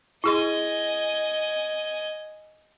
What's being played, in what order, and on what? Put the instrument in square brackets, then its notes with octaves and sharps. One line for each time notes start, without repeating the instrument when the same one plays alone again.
[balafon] E4 G#4 C6 [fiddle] D#5 G#5